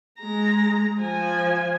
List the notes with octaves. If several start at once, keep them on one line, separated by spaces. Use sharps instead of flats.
G#3 A#5
F3 G#5